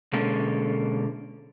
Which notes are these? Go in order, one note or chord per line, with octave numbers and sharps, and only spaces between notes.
B2 D3 G#3 A#3 C#4 A4